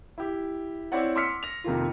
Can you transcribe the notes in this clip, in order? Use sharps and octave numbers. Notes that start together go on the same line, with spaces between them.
E4 G4
C4 E4 C#5 D5 F#5
C6 D6 E6 F6 B6 C#7
A#6 F7
F2 C3 D#3 A#3 F4